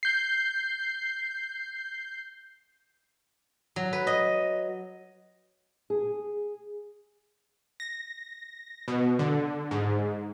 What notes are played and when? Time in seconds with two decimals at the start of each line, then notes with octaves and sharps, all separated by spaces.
0.03 G6 C7
3.76 F#3
3.93 B4
4.07 D#5
5.90 G#4
7.80 A#6
8.88 B2
9.19 D3
9.71 G#2